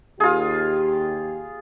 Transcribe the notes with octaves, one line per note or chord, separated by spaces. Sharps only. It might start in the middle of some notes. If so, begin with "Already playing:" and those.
D#2 F4 G4 G#4